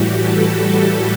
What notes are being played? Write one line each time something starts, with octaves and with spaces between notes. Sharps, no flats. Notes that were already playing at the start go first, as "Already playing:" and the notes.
Already playing: A2 E3 G3 F#4 G4
F#4 A4